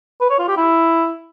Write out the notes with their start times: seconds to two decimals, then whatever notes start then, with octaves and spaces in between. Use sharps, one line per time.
0.21 B4
0.30 C#5
0.39 F4
0.48 G4
0.57 E4